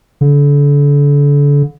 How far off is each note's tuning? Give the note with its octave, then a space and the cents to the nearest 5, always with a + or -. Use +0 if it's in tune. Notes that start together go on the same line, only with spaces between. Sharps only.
D3 -35